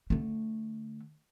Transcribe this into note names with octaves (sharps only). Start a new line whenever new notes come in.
D3 A3